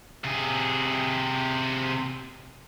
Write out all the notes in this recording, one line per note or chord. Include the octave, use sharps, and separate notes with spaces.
C3 G#4